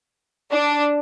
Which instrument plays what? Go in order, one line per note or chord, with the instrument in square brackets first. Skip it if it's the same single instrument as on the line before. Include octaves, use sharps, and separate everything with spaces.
[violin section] D4